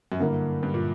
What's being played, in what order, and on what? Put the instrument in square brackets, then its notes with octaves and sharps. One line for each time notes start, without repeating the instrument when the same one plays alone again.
[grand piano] F#2
[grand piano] G2 [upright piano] D3 A#3 E4
[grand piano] G2
A#2